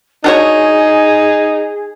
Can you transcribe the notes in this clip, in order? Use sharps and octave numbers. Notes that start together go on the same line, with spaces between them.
D4 D#4 F#4 G#4 C#5